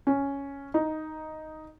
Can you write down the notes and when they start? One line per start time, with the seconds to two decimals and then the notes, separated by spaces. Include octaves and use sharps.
0.07 C#4
0.74 D#4